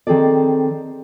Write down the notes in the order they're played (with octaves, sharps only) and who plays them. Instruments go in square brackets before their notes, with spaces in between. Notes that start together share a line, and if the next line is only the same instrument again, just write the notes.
[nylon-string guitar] D#3 C4 G#4 A4 D5